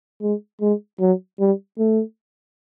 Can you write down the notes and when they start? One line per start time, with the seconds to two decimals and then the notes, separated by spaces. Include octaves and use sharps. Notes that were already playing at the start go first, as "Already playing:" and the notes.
0.22 G#3
0.61 G#3
1.00 F#3
1.40 G3
1.79 A3